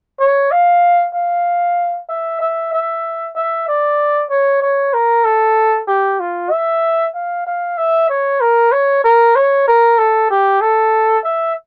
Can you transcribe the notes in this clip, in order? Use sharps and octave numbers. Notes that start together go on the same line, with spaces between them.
C#5
F5
F5
E5
E5
E5
E5
D5
C#5
C#5
A#4
A4
G4
F4
E5
F5
F5
E5
C#5
A#4
C#5
A#4
C#5
A#4
A4
G4
A4
E5